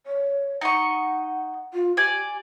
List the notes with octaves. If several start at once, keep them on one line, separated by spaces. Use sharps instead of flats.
C#5
D#4 D#5 F#5 C#6
F4
G4 D5 G#5